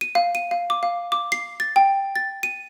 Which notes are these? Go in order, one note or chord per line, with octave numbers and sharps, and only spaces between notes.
D#7
F5
D#7
F5
D6
F5
D6
C7
A6
G5
A6
D#7